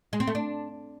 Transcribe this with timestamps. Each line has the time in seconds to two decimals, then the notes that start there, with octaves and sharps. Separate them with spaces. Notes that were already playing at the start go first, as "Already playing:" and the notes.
0.13 G#3
0.20 C4
0.27 A3
0.35 D4